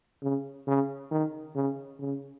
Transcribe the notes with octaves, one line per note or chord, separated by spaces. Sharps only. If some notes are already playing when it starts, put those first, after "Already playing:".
C#3
C#3
D#3
C#3
C#3